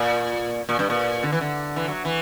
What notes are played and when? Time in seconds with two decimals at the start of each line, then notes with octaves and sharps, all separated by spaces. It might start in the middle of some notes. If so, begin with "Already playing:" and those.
Already playing: A#2
0.69 A#2
0.79 G2
0.90 A#2
1.23 D3
1.32 E3
1.41 D3
1.76 E3
1.88 F#3
2.05 E3